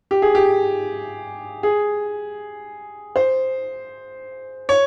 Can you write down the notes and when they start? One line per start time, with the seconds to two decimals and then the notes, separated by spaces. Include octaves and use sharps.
0.11 G4
0.22 G#4
0.35 G4
1.63 G#4
3.16 C5
4.69 C#5